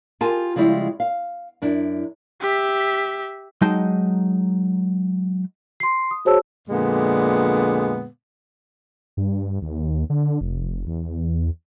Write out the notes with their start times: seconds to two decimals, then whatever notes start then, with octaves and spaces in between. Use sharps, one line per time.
0.21 F4 G4 G#4 A#4 G#5 A5
0.56 C#3 F3 G3 G#3 E4
1.00 F5
1.62 F#2 D4 E4
2.41 G4 E5
3.62 F#3 G#3 D#4 G5 A5
5.80 C6 C7
6.11 D#6
6.25 F#4 G#4 C5 C#5 A5 E6
6.68 F2 A#2 D3 G#3 B3
9.17 G2
9.62 D#2
10.10 D3
10.41 F1
10.87 E2